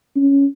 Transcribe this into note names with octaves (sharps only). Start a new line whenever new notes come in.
C#4